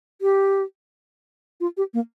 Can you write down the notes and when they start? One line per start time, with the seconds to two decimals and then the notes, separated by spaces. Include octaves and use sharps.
0.22 G4
1.60 F4
1.77 G4
1.94 A#3